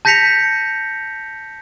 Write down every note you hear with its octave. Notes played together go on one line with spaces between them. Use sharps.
A5 G6 A#6 B6 C#7 F7